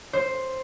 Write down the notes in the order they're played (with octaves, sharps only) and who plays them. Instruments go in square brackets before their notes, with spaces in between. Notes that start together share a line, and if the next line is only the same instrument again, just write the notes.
[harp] C5